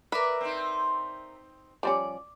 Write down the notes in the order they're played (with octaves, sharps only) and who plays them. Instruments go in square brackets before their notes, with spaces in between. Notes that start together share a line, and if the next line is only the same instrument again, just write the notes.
[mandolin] A#4 D5 E5 [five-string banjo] B4
[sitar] C4 D#4
[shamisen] F3 G3 C#4 [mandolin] D5